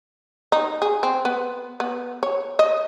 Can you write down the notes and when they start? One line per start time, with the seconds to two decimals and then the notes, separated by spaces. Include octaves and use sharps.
0.52 D#4
0.82 G#4
1.03 C4
1.25 B3
1.80 B3
2.23 C#5
2.59 D#5